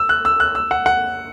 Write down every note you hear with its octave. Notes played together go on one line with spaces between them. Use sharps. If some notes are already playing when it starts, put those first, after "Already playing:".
Already playing: E6
F#6
E6
F#6
E6
F#5
F#5